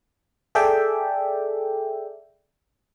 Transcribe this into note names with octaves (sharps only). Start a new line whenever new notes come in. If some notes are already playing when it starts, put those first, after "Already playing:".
G#4 A4 D5 E5 G5